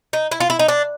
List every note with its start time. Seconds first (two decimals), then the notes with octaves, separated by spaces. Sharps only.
0.13 D#4
0.31 E4
0.40 F4
0.50 E4
0.59 D#4
0.68 D4